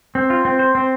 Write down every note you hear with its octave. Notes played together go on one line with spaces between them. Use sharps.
C4
F4
C4
C5
C4